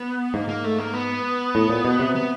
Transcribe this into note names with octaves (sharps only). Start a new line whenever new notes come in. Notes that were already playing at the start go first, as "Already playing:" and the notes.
Already playing: B3
G#2 A#3
A#3
A3
A#3
B3
A2
A#2
B2
C3
B3